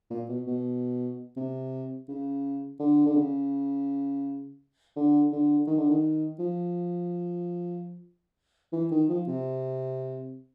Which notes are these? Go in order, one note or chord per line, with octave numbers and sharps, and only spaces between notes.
A#2
B2
B2
C3
C#3
D3
D3
C#3
D3
D3
D#3
D3
D#3
F3
E3
D#3
F3
C3